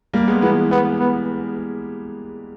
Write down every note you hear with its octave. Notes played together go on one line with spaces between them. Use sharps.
G3 A#3
G#3 B3
E3 G#3 B3
B3
B3